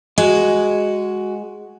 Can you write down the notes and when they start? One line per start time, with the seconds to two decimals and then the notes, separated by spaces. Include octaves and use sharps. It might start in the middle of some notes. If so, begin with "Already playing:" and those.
0.18 G#3 F#4